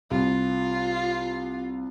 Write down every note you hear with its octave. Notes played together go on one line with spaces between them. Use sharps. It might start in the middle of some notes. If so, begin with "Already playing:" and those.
C2 F4